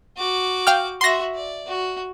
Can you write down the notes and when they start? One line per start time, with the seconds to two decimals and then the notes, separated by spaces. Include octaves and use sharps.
0.17 F#4 D6
0.67 F5 G5 F6
1.01 F#4 E5 C6 A#6
1.35 D5
1.68 F#4